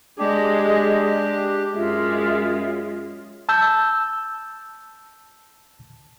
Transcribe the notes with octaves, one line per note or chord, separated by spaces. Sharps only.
G#3 D4 G4 G#4 D#5
F#2 G#3 F4 E5
A5 E6 G6